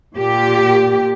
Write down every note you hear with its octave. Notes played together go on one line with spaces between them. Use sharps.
A#2 G4